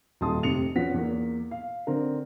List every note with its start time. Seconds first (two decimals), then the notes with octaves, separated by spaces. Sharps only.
0.21 D#1 D#4 A5 C6 D#6
0.43 F1 C3 A3 C#7 F7
0.75 E2 B3 C#4 F4 F#5 B6
0.94 E2 A#3
1.51 F5
1.87 D3 C4 A#4